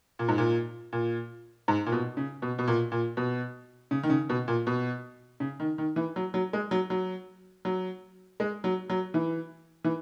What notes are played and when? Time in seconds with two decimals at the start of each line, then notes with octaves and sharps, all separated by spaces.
0.19 A#2
0.28 G#2
0.38 A#2
0.93 A#2
1.68 G#2
1.86 A#2
1.92 B2
2.17 C#3
2.42 B2
2.59 B2
2.67 A#2
2.92 A#2
3.17 B2
3.91 C#3
4.03 D#3
4.10 C#3
4.29 B2
4.48 A#2
4.67 B2
5.40 C#3
5.60 D#3
5.78 D#3
5.96 E3
6.16 F#3
6.34 F#3
6.53 G#3
6.71 F#3
6.90 F#3
7.65 F#3
8.40 G#3
8.64 F#3
8.90 F#3
9.14 E3
9.84 E3